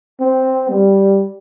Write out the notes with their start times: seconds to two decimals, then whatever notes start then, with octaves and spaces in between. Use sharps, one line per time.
0.20 C4
0.69 G3